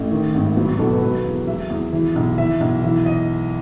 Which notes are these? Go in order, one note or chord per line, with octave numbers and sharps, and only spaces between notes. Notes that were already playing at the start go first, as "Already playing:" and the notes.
Already playing: A1 A3
D#3
G#1
F#3 B3
F#4
B1 A4
B4
F#3 B4
E2
F#3 E5
E2
E3
B1
E3 E5
B1
E3 E5
D#5